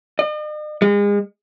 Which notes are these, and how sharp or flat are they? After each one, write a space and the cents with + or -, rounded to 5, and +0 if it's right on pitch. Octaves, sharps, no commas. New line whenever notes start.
D#5 -45
G#3 -35